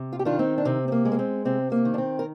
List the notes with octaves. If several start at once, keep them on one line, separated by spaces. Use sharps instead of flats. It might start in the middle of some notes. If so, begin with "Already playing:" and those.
Already playing: C3
F4
G4
D#3 D4 F4
C4 D#4
D4
C3 C4
C4
A#3
G#3
A#3
C4
C3 C4
A#3
D#3
D4
C4
A#4